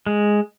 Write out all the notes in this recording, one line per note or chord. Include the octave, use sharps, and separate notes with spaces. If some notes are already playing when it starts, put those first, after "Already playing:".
G#3